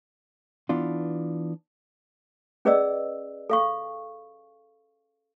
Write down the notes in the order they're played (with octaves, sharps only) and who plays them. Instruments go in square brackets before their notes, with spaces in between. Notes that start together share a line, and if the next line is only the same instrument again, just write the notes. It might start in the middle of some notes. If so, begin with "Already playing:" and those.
[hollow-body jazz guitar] E3 B3 D4 F4
[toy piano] C#4 G#4 B4 D5 D#5 E6
A4 F5 C#6